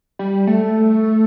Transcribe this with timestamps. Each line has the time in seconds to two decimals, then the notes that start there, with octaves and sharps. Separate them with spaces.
0.19 G3
0.47 A3